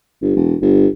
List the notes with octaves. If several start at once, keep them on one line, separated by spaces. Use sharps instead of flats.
G1
E1
G1